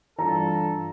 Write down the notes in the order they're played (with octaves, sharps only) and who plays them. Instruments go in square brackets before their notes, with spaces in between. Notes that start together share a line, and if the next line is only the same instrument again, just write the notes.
[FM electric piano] G2 E3 [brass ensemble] D4 F4 A4 [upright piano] A#5